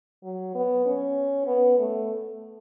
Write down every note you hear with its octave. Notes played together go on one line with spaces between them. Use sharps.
F#3
B3
C#4
B3
A3